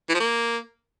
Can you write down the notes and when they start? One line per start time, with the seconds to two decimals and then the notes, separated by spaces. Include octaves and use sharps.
0.09 E3
0.14 F3
0.20 A#3